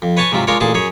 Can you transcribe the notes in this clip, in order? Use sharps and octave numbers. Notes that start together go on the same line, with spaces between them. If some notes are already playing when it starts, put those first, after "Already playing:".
F2
B4 C#5 G#5 A5 C#6
G#2 C3 F#3 F4
G#3 D4 F4 A#4 C#5
A1 A#2 G#4 A5 C6
F#2 G#4 C#5